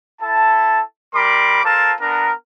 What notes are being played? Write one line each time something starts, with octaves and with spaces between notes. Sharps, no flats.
E4 A4 A5
G3 A#4 B5 C6 D6
F4 A4 A#4 C5 A5
B3 D4 A#4